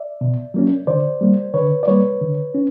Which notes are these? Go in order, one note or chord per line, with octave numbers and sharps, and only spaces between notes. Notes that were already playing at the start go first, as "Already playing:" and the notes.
Already playing: D5 E5
B2
F#3 A#3 C#4
D3 C5 D5
G3 A#3
D3 B4 C#5
D5
G3 A#3 B4 C#5
D3
C#4